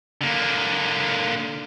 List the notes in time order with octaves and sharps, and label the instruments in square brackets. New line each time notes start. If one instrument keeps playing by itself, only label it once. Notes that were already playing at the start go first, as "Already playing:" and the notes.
[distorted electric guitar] D3 A#3